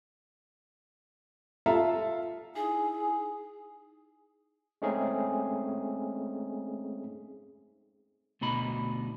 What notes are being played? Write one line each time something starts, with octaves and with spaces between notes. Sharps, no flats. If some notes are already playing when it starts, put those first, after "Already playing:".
F4 A4 E5 F5 A#5
D#4 E4 G#4 G#5
G#3 A3 C4 C#4 D#4 G#4
D2 B2 D#4 B5